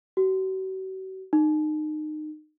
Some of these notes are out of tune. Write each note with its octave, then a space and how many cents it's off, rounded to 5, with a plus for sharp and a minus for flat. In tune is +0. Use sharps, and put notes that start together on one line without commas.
F#4 +40
D#4 -25